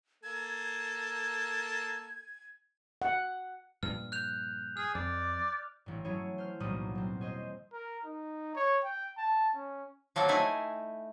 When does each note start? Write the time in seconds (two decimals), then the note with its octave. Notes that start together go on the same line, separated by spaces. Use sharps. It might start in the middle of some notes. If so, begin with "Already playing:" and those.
0.24 A#3 A4 G#6
3.02 F#5
3.83 G2 A#2 F3 F6
4.12 F#6 G6 F7
4.77 G#4 F6
4.95 F2 D5
5.86 A1 G2
6.04 F#3 A3 C#4 E4 G#4 C#5
6.38 C5 F6
6.60 E1 B1 A2 G3 A#3 D#6
6.95 F#3 C4
7.21 G#4 C5 D#5
7.73 A#4
8.05 D#4
8.55 C#5
8.84 G5
9.17 A5
9.55 C#4
10.16 F3 F#3 A#3 A4
10.28 A3 D#4 E4 G#5